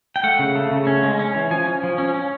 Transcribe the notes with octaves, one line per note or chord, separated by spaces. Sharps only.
G5
A3 F#5
C#3
A3
C#3
C#4
G#3
C#4
E3
F3 G#5
C#4
F3
C#4
C#4